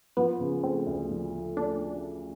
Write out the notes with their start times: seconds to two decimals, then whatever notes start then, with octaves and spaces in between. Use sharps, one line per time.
0.17 F3 B3
0.40 C#3
0.63 A3 C4
0.86 D2
1.10 F3
1.33 A3
1.57 A3 D4